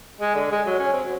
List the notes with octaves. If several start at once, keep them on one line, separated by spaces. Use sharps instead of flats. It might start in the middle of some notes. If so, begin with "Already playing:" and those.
G#3
D3
G#3
F#3
C#4
C4
F#3